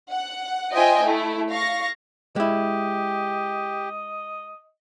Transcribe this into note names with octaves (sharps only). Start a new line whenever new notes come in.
F#5
F4 C5 D#5 E5 G5 G#5
A3 E4
F5 C#6 A#6
G#3 E4 G4 D#5